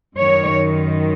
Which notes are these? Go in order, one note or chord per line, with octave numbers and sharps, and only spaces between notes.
F#2 D#3 C#5